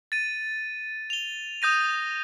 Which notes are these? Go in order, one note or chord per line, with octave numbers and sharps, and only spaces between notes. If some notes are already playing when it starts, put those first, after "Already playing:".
A6 D#7
F7 G7
D#6 G6 A#6 D#7